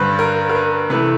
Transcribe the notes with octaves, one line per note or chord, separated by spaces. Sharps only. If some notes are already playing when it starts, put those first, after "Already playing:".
Already playing: G2 D3 G3 B4 C5
A#4
A#4
B4
C3 E3 A3 B4